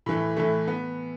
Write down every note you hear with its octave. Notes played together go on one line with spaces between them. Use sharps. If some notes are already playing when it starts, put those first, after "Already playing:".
A2 E3 A3
A2 E3 A3
B3